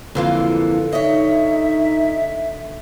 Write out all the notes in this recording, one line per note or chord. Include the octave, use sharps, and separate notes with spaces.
F2 D3 E3 A#3 F4 F5
D#4 C#5 D#5 E5